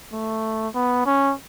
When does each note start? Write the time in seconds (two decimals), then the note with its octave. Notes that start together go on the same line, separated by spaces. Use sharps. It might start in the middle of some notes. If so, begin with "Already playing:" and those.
0.13 A3
0.75 B3
1.06 C#4